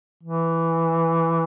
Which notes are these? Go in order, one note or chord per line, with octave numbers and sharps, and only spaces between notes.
E3